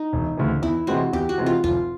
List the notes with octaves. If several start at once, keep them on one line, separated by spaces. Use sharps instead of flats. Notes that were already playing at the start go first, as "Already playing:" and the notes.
Already playing: D#4
E1
D2 C#3 E3
E2 E4
C3 E3 G#3 C4 F#4
E2 G4
F#4
C3 E3 G#3 C4
F4
F1 F4